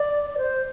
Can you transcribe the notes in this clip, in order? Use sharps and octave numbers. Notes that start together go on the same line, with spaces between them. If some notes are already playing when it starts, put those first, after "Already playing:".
Already playing: D5
D5
C5